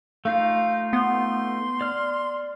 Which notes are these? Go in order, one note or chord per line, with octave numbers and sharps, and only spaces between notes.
A3 D#4 F4 F5
B3 C6
D5 F6